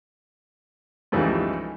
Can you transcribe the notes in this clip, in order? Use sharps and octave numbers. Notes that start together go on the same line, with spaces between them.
C#2 G#2 E3 F3 G3 A3